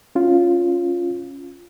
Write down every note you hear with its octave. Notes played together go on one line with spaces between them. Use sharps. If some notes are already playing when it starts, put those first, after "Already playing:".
C#4 F4